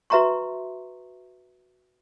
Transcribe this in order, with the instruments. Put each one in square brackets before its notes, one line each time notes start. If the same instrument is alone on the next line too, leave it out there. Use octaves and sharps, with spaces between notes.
[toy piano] F#4 B4 E5 A#5 C6 C#6